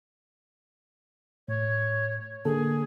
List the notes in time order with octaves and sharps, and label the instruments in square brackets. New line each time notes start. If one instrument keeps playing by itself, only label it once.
[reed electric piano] A2 [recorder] C#5
[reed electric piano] D3 A#3 A4 [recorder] G#4